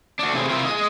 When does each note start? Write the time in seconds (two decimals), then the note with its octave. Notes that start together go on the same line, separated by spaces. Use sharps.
0.19 D4 F#4
0.33 A2 C3 A3 C4 G#4
0.50 C3 E4 F4 A#4 C5
0.65 G#4 D#5